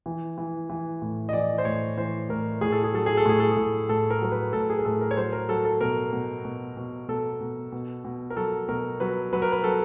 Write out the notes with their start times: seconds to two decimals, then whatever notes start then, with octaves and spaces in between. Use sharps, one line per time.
0.06 E3
0.38 E3
0.70 E3
1.02 A2
1.29 D#5
1.33 E3 D5
1.58 C5
1.65 A2 C#5
1.98 E3 C5
2.29 A2 A#4
2.61 A2 G#4
2.72 A4
2.84 G#4
2.93 F#3 A4
3.06 G#4
3.17 A4
3.25 A2 G#4
3.40 A4
3.51 G#4
3.57 A2
3.89 A2 A4
4.10 A#4
4.21 F#3 A#4
4.32 B4
4.53 A2 A4
4.70 G#4
4.79 A#4
4.85 A2 A4
5.01 A#4
5.11 C#5
5.17 F#3 C5
5.33 A#4
5.49 F#3 A4
5.65 A4
5.81 B2 A#4
6.13 B2
6.45 B2
6.77 B2
7.08 B2 A4
7.41 B2
7.72 B2
8.05 B2
8.30 A#4
8.37 F#3 A4
8.69 B2 A#4
9.00 F#3 B4
9.33 F#3 B4
9.42 A#4
9.52 B4
9.64 F#3 A4